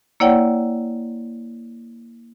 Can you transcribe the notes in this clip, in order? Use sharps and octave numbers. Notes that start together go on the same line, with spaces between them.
A#3 E4 C#5 D5 F#5 G5